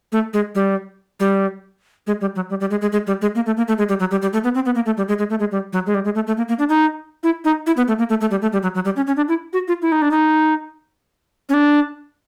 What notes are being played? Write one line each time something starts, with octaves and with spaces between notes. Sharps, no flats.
A3
G#3
G3
G3
G#3
G3
F#3
G3
G3
G#3
G#3
G#3
G3
G#3
A#3
A3
A#3
A3
G#3
G3
F#3
G3
G3
A3
B3
C4
B3
A#3
A3
G3
G#3
G#3
A3
G#3
G3
F#3
G#3
G3
G#3
A3
A3
A#3
A#3
D4
D#4
E4
D#4
E4
B3
A3
A#3
A3
A3
G3
A3
G3
F#3
F#3
G3
C#4
C#4
D4
E4
F#4
F4
E4
D#4
D4
D#4
C#4
D4